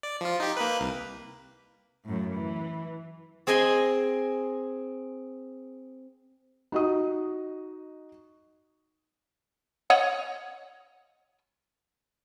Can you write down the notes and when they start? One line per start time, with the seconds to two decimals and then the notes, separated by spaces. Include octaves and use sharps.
0.03 D5
0.21 F3 F4
0.40 D#4 G4
0.57 A#3 B4
0.80 C2
2.05 F#2 A2
2.34 E3
3.47 C4 G#4 D#5 G#5 C6
6.72 D#4 F#4 D#5 D#6
9.90 C#5 D#5 F#5